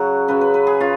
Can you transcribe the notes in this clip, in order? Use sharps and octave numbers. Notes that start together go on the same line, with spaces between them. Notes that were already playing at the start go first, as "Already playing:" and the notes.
Already playing: C#3 F#3 F#5
C#3 F#3 B4
B4
B4
G#4
C#3 F4